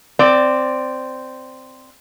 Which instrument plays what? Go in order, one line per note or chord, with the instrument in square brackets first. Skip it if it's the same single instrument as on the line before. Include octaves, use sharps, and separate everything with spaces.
[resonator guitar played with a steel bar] C4 D5